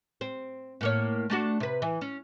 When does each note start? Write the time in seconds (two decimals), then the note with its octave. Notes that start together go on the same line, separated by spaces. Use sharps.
0.21 C4
0.81 A2 A#3 C#5
1.30 A3 D4 F#4
1.60 C3 B4
1.82 E3
2.01 C#4